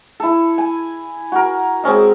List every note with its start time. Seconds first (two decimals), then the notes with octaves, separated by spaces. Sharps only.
0.20 E4 A4
0.58 G#5
1.32 F#4 A#4
1.84 G#3 C4 C#4 D#5